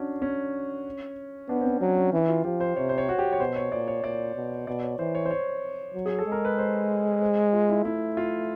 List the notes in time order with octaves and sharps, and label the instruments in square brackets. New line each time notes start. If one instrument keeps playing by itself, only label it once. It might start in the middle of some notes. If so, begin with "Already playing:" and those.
Already playing: [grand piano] C#4 D4 F#4
C#4
[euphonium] B3 [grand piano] D4
[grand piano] C4
C#4
[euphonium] F#3 [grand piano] C4
[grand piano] C#4
[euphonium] E3
[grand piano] F4
[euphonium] F3 [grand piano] G4
[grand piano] C5
[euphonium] C3 [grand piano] C#5
[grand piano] C5
C#5
F#4
G4
C#5
[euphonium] B2 [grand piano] C5
[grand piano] C#5
[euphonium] A#2 [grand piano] D5
[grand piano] C#5
[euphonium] A#2 [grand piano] D5
[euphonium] B2
[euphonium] B2 [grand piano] D5
[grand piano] C#5
[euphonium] E3 [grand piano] C5
[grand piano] C#5
C5
C#5
[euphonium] F#3
[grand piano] G#4
A4
[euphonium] G#3
[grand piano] A#4
B4
C5
C5
F4
E4
[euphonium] A3 [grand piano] E4
[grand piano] F4